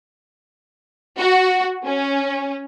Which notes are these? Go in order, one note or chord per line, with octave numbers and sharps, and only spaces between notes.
F#4
C#4